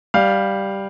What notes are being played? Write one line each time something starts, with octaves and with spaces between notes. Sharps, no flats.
G3 F5